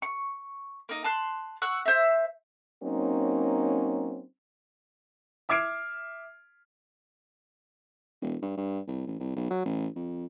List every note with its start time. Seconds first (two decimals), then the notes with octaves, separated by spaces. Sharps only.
0.02 C#6
0.89 A#3 D#4
1.04 A5 C6 F#6
1.62 F#5 C#6 E6 F#6
1.86 C5 E5
2.83 F#3 A#3 C4 C#4 D#4
5.49 E5 D6 F6 G#6 C7 D7
8.22 E1
8.42 G2
8.57 G2
8.88 C2
9.07 A1
9.20 C2
9.36 B1
9.50 F#3
9.65 A1
9.96 F2